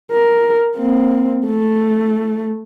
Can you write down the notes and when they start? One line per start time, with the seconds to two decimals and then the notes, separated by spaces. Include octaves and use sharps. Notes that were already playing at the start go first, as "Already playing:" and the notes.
0.12 A#4
0.77 A#3 C4
1.46 A3